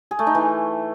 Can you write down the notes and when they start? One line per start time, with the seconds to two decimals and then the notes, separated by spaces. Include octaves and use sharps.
0.11 G#4
0.19 A3
0.27 D#4
0.35 E3